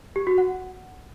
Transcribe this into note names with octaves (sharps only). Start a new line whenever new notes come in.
G4
F#4
F#5